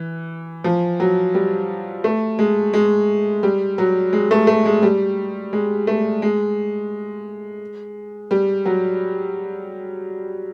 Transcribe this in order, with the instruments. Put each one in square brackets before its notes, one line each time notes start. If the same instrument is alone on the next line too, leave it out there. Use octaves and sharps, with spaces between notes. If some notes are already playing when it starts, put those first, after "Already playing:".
Already playing: [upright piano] E3
F3
F#3
G3
A3
G#3
G#3
G3
F#3
G#3
A3
A3
G#3
G3
G#3
A3
G#3
G3
F#3